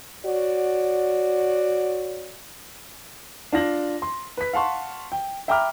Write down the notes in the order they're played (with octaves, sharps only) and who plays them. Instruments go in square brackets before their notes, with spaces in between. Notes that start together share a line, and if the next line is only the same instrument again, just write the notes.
[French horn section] F#4 C#5 D5
[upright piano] D4 F4 A#6 F#7
C6
B4 B6
F5 F#5 A5 C6 C#6
G5
E5 G5 A#5 B5 D6 F6